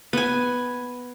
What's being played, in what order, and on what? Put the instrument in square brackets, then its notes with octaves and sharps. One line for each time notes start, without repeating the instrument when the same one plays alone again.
[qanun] B3 G#5